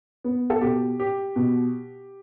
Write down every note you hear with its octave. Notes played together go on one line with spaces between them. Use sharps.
B3
A4
B2 G4
G4
B2